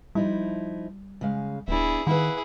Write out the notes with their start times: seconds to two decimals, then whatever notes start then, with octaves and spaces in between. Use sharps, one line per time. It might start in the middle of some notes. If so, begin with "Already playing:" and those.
0.15 F3 G3 D#4 E4
1.21 C#3 G#3 F5
1.68 D1 B3 D4 E4 G#4
2.07 D#3 E4 G#4 B4 F5 F#5